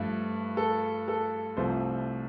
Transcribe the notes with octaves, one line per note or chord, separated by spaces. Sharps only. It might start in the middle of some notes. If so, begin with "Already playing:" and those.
Already playing: G2 F3 A3
A4
A4
C2 C3 F3 A3 C5